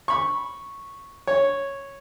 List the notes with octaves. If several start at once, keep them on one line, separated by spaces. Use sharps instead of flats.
B5 C#6
C#5